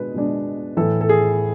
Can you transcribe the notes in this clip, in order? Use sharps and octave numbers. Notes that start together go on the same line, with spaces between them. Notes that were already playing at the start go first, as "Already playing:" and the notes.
Already playing: B2 G#3 D4 B4
B2 G#3 D4
A2 E3 A3 A4
A4
G#4